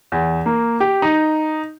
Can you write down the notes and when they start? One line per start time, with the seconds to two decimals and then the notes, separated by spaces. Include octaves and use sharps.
0.12 E2
0.46 A#3
0.80 G4
1.02 D#4